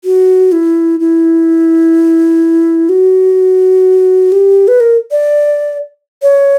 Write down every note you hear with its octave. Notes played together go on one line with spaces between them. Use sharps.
F#4
E4
E4
F#4
G4
B4
A#4
D5
C#5